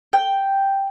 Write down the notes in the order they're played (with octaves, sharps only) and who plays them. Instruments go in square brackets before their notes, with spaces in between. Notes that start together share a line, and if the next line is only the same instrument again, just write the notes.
[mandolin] G5